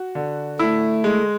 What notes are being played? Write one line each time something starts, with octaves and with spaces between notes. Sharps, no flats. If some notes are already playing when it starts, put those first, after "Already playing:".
Already playing: F#4
D3
A3 E4
G#3